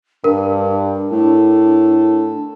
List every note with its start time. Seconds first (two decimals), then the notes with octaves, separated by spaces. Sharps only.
0.24 G2 D4 A#4
1.12 A2 A4